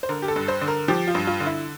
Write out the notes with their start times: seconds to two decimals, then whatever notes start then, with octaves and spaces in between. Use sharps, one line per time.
0.03 C5
0.09 D3 A#4
0.22 G4
0.28 A4
0.36 G2
0.48 C5
0.61 D3
0.68 A#4
0.88 F3 G4
1.08 F4
1.15 G2
1.27 F4
1.40 D3
1.46 E4